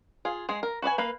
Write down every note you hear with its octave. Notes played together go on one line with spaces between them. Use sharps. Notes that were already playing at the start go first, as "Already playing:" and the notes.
F4 G#4
G#3 G#4
A#4
F#4 B4 D5 G#5
A#3 B4 F5